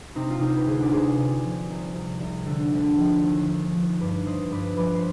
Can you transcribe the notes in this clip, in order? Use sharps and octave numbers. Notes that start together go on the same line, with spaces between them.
C3 C4 D#4
F4
C3 D#4 G4
B4
D2 F4 G#4
D5
C3 G#4 C5
C3
F3
C2
C2
C2
D3
D2
F3
D#2
D#2
F3
G2 B4 D5
F3 C5 D#5
G2 B4 D5
F3 B4 D5
C5